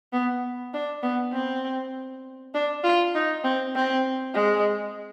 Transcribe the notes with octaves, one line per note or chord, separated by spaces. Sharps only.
B3
D4
B3
C4
D4
F4
D#4
C4
C4
G#3